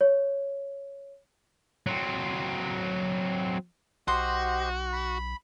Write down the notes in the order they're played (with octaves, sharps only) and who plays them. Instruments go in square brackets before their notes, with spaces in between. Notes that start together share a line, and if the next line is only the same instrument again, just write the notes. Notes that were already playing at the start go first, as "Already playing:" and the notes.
[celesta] C#5
[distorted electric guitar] F#3 C4
[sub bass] B1 [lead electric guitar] F#4 [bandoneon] G4 C5 D#5 [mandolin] C6
[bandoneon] B5